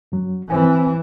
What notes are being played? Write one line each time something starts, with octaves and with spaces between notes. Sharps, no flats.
F#2 F#3
E3 C4 C5 G#5